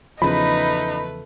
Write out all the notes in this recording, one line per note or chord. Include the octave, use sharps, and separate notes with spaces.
E2 C#3 F3 A3 D#4 B4 B5